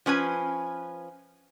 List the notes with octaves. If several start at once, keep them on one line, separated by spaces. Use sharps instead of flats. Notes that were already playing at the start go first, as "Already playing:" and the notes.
F3 C#4 B4 G#5